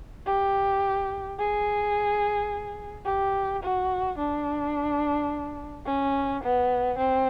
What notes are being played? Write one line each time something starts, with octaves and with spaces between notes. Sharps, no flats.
G4
G#4
G4
F#4
D4
C#4
B3
C4